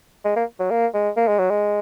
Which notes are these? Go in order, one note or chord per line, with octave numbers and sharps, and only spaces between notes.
G#3
A#3
F#3
A#3
G#3
A#3
G#3
F#3
G#3